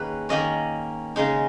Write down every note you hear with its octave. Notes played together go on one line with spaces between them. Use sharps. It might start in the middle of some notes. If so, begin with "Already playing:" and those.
Already playing: D#3 A#3 C#4 G#4 B4
D#3 A#3 C#4 D#5
C#3 G#3 D#4